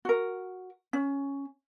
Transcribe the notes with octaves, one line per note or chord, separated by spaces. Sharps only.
F#4 A#4
C#4